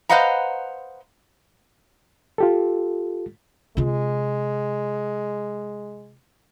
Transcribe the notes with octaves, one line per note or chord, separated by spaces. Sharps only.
B4 C5 D#5 F5 F#5 A#5
F4 G4 A4
C3 G#3 F4